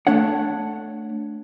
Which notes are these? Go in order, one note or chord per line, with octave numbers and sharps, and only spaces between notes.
A3 D4 C#5 F#5